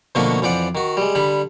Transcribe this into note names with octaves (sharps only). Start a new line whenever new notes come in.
B2 D3 F3 A3 A#3 F#4
F2 E3 C5 D5 F#5
D#3 F#4
G3 G#3
D3 G3 B5